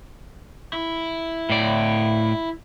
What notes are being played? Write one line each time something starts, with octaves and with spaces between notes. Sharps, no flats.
E4
A2 D5